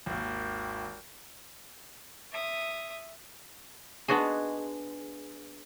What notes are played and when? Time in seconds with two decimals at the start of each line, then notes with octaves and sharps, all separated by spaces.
0.06 G#1 D#2
2.32 E5 D#6
4.08 G#3 B3 D4 F#4 G#4